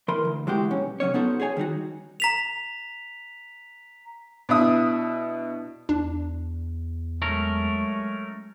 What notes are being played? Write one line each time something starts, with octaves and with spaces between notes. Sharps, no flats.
E3 A#4 B5 C6
D2
E3 G#3 F#4 G4
B1 C#4
C3 F#3 C#4 C#5
B3 C#4 D#4 F#4 A4 C5
G#4 C5 C#5 G#5
D#3 G3 D#4 F#4
A#5 B6 F7
B2 D4 E4 E5 D#6
E2 D4
F#3 G#3 A3 C#4 A#4